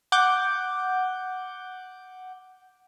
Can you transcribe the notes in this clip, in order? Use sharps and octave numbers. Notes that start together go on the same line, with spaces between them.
F#5 D6 G6